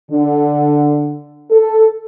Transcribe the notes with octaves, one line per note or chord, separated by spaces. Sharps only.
D3
A4